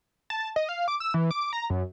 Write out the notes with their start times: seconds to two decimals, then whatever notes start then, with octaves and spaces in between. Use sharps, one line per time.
0.30 A5
0.56 D#5
0.69 F5
0.88 D6
1.00 E6
1.14 E3
1.31 D6
1.53 A#5
1.70 F#2